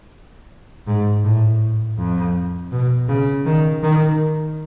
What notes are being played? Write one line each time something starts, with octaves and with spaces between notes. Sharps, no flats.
G#2
A2
F2
B2
C#3
D#3
D#3